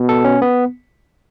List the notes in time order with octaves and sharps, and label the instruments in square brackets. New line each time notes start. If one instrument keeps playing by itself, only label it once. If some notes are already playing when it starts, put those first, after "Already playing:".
Already playing: [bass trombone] B2
[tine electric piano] A4
C#4
B3